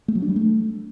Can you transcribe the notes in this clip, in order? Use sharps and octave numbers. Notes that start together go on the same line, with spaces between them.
A3
F#3
D4
G3
A3